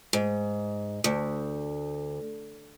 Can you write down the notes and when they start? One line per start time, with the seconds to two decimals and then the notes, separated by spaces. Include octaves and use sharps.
0.13 G#2
1.04 D2